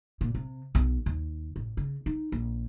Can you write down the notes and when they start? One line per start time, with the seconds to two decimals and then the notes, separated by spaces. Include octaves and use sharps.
0.21 A#2
0.35 C3
0.75 B1
1.06 D#2
1.56 A1
1.77 C#3
2.06 D#4
2.32 A#1